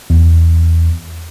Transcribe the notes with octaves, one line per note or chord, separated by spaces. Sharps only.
E2